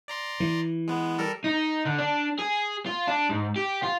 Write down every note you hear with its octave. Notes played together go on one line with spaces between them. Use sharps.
D5 A#5 C6
E3
G#3 B3
G3 A4 A#4
D#4
D3
D4
G#4
F4
D4
G#2
G4
F4